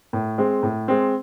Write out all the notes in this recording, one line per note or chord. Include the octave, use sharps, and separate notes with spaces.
A2
G#3 C4
A2
G#3 C4